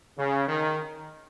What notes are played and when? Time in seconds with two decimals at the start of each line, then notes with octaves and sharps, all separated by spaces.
0.18 C#3
0.48 D#3